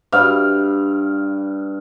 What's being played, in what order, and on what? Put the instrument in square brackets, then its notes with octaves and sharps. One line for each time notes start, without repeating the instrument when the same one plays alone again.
[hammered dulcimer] G2 F5